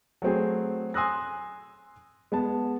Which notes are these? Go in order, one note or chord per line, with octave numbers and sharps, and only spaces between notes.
F#3 A3 C4 G#4
G#5 C6 D#6 E6 F#6 A#6
G#3 B3 A5